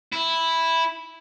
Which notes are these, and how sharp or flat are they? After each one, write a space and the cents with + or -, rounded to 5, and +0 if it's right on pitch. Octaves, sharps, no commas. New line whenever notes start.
E4 -5